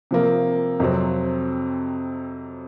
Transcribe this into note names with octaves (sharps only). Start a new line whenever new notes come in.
C3 F3 A#3
F2 C3 F#3 C4